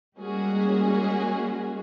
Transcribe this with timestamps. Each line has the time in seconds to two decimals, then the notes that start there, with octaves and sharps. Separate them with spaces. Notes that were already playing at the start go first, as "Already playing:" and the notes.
0.17 G3 G#3 A#3 C#4 F#4 G#4